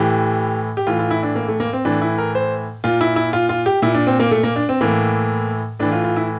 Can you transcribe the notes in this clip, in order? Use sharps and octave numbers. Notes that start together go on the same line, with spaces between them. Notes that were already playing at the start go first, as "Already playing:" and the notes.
Already playing: A2 E3 G4
G4
A2 E3 F4
F4
E4
D4
A#3
A3
A#3
C4
A2 E3 D4
E4
A#4
C5
A#2 F4
E4
E4
F4
F4
G4
A#2 E4
D4
C4
A#3
A3
A#3
D4
C4
A2 E3 A#3
A2 E3 D4
F4
F4
E4